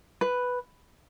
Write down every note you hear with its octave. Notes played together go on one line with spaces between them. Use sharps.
B4